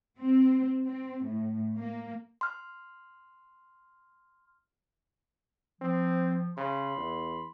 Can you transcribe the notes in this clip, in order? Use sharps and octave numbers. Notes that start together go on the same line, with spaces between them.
C4
C4
A2
A#3
C6 F6
F3 C4
C#3 B5 C6
E2